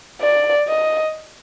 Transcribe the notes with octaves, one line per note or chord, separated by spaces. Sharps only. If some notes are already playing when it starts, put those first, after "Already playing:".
D5
D#5